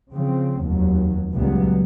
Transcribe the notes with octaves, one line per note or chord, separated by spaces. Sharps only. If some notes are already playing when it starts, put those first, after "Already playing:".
C#3 F3 C4
F1 D#2 F#3
C#2 A#2 F#3 G3 B3